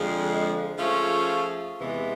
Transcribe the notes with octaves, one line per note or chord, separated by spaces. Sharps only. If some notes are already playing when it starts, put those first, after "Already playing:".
Already playing: F2 D3 F3 G#3
F3 A3 C#4 F4 G#4
E2 C3 E3 G#3 B3